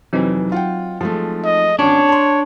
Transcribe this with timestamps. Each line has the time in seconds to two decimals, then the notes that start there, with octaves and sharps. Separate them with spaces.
0.13 F1 E3 F#3 C4 D#4
0.52 F4 F#5 G5
1.01 F3 G#3 A3
1.45 D#5
1.79 G#1 C#4 D4 C#5
2.09 A5 C6